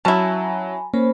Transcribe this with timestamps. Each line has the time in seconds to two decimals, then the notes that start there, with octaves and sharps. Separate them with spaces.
0.05 F#3 C#4 E4 G#5 A5 B5
0.94 A#3 C#4 C5 B5